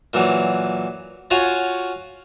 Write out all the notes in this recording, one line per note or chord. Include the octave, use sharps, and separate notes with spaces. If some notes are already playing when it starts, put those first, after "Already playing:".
A#2 E3 F#3
F4 F#4 C#5 F5 G#5